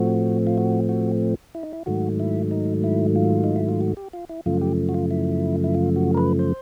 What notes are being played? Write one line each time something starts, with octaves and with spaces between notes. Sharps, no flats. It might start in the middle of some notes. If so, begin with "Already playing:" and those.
Already playing: A2 F3 A3 C4 F#4
F4
F#4
F#4
E4
D#4
E4
G#2 D#3 F#3 A3 F#4
E4
D#4
E4
F4
D#4
E4
F4
F#4
G4
F4
E4
F#2 C#3 F3 A3 F4
G4
F#4
F4
E4
E4
F4
F#4
A#4
B4
C5